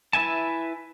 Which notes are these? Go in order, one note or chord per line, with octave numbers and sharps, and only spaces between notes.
E4 B4 E5 G#5 A5